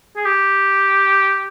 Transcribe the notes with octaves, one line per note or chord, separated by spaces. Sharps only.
G#4
G4